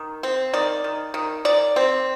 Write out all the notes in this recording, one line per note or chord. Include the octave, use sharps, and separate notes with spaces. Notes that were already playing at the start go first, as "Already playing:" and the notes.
Already playing: D#3
C4
D#3 D5
D#3
D#3
D#3 D5
C4